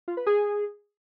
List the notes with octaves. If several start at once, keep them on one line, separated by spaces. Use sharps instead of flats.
F4
B4
G#4